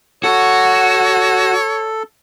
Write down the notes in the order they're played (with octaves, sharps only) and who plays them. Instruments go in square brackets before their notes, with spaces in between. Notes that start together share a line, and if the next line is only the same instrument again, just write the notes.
[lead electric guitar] F#4 [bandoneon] A4 [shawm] C#5